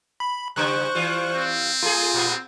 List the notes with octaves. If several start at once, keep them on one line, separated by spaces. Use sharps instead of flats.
B5
C#3 G3 C5 C#6 F#6
E3 G3 F4
C4
A3 F4 G#4
A#2 B3